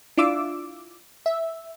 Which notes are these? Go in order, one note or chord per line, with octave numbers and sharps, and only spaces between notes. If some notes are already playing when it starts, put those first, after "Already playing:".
D4 E4 F4 D6 E6
E5